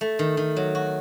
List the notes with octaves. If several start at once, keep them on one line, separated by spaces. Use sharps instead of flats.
A3
D#3
D#3
F#3
F#4